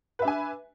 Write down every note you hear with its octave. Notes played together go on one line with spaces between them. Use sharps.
D4 B4 E5 G#5